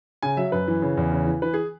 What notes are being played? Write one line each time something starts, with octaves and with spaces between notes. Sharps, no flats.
C#3 G#5
F#3 E5
F#2 B4
E3
C#3
E2
C#3
E3
E3 B4
G#4